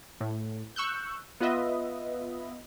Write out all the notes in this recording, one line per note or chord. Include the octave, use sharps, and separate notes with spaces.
A2
C#6 E6 F#6 G6
B3 F4 B4 D#5 E5